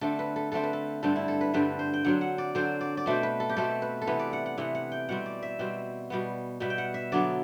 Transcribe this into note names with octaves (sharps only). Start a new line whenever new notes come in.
D3 A3 C4 A4
B4
A4
D3 A3 C4 A4
B4
A4
G2 D3 G3 C4 A4
E4
A4
B4
G2 D3 G3 C4 B4
C5
G5
D3 F#3 C4 F#5
F#5
D5
D3 F#3 C4 C5
D5
D5
B2 A3 C4 C5
B4
A4
G4
B2 A3 C4 A4
B4
A4
C3 E3 B3 B4
D5
F#5
F#5
C3 E3 B3 F#5
F#5
G5
B2 G3 C4 F#5
D5
E5
B2 G3 C4
B2 G3 B3
B2 G3 B3 E5
G5
F#5
E5
D3 F#3 B3 D5